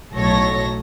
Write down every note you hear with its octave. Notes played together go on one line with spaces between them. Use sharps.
B1 A2 F#3 A4 C#5 A#6